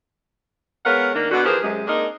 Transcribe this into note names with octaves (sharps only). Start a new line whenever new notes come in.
G#3 B3 A#4 C#5 F5 F#5
D#3 A#3 D4
B2 D3 F#4
E3 F3 G4 G#4 A#4 C5
F#2 C3 G#3
A#3 C4 D4 D#4 G#4 A#4